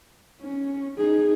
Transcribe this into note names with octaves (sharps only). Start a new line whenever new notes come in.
C#4
D#4 G#4